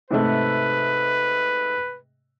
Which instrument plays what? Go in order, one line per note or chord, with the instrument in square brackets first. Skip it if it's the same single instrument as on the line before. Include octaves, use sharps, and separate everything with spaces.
[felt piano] G#2 C3 A3 [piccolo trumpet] B4